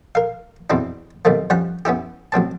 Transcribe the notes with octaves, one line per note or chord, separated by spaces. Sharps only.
A#4 F5
E2 B2 C4 D4 E4
B1 C3 D#3 A3 A#3
F3 G3 C#4 F#5
B3 C#4 E4 G4
A1 F#3 C4 A5